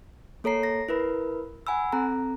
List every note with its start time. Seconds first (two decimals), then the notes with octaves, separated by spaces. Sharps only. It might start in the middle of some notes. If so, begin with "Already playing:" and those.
0.44 A#3 A4 C#5 A#5 C7
0.63 A#6
0.89 E4 A#4 B4 B5
1.67 F#5 G#5 B5 E6
1.92 C4 A4 A#5